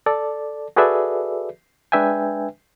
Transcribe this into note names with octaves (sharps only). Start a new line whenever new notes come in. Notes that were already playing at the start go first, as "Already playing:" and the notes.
A4 D5 A5
F#4 G#4 A4 B4 D5 E5
G#3 D4 B4 E5 G5 G#5